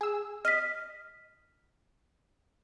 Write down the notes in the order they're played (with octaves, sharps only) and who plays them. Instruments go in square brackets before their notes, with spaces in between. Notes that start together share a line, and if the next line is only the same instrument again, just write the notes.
[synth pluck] G#4 E6
[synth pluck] D#5 [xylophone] F6 B6